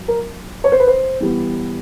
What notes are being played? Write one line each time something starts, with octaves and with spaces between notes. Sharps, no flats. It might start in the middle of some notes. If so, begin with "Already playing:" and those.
Already playing: F#3
A#4
C#5
C5
B4
C5
E3 G3 B3